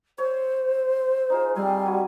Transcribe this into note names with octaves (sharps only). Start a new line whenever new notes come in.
C5 C#5
D#4 F4 G#4
G3 C4 G#5 C6
F#4 B4 G#5